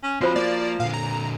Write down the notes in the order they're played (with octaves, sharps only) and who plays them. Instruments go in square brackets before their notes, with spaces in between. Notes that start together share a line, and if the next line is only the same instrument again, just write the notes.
[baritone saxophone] C#4
[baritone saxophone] F3 [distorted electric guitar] C4 C#5 [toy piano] F#4 C5 B5
[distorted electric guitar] A#3 [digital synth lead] D5
[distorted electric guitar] A#2 D3 [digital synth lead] F5
[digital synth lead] A#5